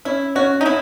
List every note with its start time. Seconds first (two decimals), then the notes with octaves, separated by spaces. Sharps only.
0.05 C#4 E4
0.35 C#4 F#4
0.61 D#4
0.66 C#4 E4